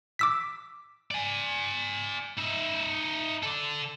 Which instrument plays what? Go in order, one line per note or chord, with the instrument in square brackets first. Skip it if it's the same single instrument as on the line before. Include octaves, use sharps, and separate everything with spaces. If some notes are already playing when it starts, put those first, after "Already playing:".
[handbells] D6 E6 B6
[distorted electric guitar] D5 G#5
D#4 E5
A4 D5